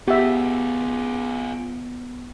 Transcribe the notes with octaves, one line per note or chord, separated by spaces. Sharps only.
B3 F4 G4 G#4 E5